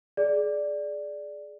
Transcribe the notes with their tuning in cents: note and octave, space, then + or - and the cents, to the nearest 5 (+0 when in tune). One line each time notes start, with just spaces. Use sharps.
G#4 +20 D5 +0